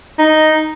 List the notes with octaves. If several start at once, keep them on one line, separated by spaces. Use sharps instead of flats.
D#4